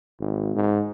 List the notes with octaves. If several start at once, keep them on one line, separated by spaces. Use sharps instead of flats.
G#1
G#2